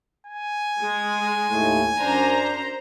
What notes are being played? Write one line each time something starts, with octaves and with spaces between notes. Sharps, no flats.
G#5
G#3
D#2 A2 A3
F#2 D4 A#4 C5 A#5